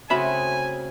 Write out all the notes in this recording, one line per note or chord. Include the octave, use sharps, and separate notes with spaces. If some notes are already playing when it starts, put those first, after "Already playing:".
C#3 A3 C4 D#4 F#4 E5 G#5 B5